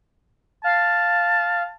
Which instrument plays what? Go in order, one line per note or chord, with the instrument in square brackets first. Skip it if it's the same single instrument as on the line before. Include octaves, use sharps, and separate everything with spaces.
[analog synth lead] F5 [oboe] A5